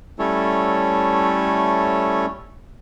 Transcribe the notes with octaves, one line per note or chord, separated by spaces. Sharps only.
G3 A3 C#4 E4 A4 C#5